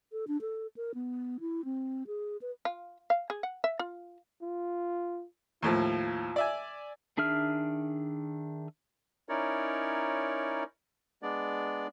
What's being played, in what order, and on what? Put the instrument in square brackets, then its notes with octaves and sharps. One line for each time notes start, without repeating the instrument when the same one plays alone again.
[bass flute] A4
D4
A4
A#4
B3
E4
C4
G#4
B4
[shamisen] F4
F5
G#4
F#5
E5
F4
[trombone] F4
[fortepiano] D#2 A2 F3 [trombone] F4
[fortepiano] D5 E5 G#5
[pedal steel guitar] D#3 D4 G#4 E5 F6
[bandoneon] C#4 D#4 E4 A#4 C#5 D5
G#3 B3 D4 D5